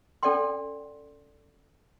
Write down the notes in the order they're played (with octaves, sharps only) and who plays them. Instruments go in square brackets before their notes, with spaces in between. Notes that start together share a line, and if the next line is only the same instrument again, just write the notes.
[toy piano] C#4 A4 D5 F#5 G5 C6